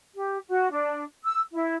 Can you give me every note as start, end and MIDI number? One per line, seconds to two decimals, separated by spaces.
0.15 0.38 67
0.48 0.70 66
0.70 1.04 62
1.24 1.41 88
1.52 1.75 64